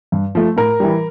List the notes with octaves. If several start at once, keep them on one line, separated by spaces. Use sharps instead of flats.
G2
F3 A3
A2 A#4
E3 G3